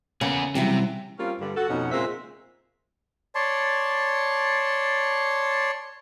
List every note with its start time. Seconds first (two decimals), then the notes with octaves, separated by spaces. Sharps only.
0.21 C#3 A#3 B3 G#4
0.55 C3 E3 F#3 G3 E4
1.18 G3 A#3 C4 C#4 F4
1.40 G2 D3 G3
1.56 F#4 A4
1.68 F2 B2 C#4 D#4 F#5
1.91 A#2 C#3 G#3 C4 C5 E5
3.35 C#5 D5 A5 C6